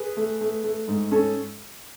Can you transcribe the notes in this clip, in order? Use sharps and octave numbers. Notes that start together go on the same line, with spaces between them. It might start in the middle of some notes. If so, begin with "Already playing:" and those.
Already playing: G#4 B4
A3
A3
A3
G#2
C#4 A4